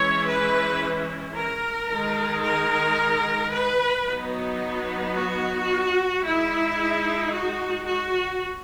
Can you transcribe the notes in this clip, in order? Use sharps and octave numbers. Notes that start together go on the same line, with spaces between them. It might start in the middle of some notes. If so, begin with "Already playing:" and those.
Already playing: E3 G#3 C#4 E4 C#5
B4
A#4
D#3 G#3 D#4
A#4
B4
F#3 B3 D#4
F#4
G#3 D#4 E4
F#4
F#4